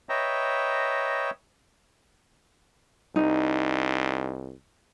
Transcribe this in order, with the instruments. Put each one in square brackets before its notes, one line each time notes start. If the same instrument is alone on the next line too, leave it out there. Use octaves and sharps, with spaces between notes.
[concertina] B4 C#5 D#5 E5 G5 A#5
[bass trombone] C2 [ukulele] D#4